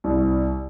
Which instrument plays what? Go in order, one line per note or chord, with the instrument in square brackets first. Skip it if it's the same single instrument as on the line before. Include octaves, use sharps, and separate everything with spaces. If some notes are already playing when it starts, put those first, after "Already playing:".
[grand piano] C2